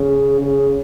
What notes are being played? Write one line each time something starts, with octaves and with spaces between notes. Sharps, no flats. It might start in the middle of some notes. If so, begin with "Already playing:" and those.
Already playing: C#3
C#3